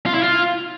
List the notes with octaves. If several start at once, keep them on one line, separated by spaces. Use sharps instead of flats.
F4
E4
F4